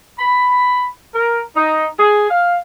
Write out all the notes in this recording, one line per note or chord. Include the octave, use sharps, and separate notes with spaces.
B5
A#4
D#4
G#4
F5